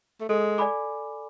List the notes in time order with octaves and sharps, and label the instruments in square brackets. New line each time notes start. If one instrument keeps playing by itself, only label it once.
[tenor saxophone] A3
[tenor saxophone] G#3 [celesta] A4
[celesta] D5 G#5 B5 D6